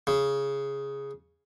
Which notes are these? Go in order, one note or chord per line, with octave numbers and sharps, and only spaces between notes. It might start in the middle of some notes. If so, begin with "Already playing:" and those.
C#3